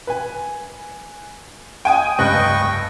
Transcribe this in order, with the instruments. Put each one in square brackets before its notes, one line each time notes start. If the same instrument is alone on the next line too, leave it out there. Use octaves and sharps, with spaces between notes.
[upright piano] B4 G#5
[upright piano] D#5 D7 [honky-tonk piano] G5 G#5 D#6
[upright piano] F1 C#2 G2 [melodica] D#5 G5 C#6 [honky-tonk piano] F#6